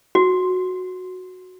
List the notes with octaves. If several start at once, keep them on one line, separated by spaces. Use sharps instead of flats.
F#4